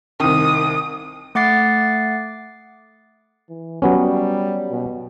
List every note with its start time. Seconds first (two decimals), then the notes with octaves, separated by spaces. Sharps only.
0.20 C2 D#3 D#6
1.35 A3 F#5 D6 A6 C7
3.49 E3
3.82 F#3 G3 B3 C#4
4.71 B2